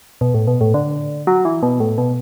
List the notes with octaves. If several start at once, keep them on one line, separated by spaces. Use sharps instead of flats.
B2
A2
B2
A2
D3
F#3
E3
B2
A2
B2